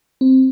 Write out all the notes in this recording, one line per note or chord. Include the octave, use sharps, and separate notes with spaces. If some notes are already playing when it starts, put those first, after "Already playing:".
C4